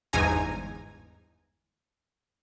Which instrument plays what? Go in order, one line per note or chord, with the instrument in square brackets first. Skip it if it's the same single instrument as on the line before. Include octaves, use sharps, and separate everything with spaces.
[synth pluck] G1 E2 G#2 D#4 G#5 A#5